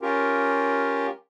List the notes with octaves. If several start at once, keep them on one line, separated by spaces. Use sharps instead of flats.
C#4 F4 G4 A#4